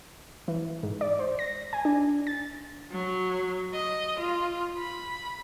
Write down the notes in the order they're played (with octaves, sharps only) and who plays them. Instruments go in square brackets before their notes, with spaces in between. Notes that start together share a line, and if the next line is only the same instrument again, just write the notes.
[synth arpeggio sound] E3
G#2
D5
C5
A#6
G#5
D4
A6
[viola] F#3
D#5
F4
B5